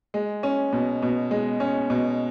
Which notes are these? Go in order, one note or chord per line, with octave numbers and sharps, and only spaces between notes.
G#3
C#4
B2
B2
G#3
C#4
B2